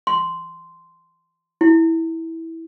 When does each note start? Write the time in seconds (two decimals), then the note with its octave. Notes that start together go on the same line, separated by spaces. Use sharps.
0.07 C6
1.61 E4